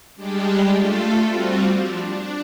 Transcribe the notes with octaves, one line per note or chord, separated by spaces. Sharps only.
G3 G#3 D4 G4
A3 F4 A4
G3 C4 F4 F#4
F3 D4
D4